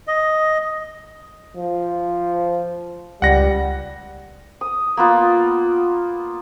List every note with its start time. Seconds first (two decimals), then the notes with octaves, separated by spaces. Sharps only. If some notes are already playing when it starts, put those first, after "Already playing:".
0.07 D#5
1.57 F3
3.22 C#2 G3 F#5 A#6
4.61 D#6
4.97 A#3 B3 F4